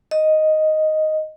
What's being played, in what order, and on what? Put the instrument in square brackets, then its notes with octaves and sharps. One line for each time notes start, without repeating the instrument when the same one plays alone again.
[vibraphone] D#5